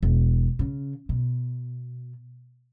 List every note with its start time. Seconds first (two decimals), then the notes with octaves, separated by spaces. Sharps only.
0.03 E1
0.59 C#3
1.09 B2